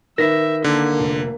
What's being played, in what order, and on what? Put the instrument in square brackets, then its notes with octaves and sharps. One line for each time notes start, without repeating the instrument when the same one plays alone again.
[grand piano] D#3 B4 B6 [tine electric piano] A#4 A#6 [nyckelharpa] E5
[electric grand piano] D3 [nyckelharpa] A#3
[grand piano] F1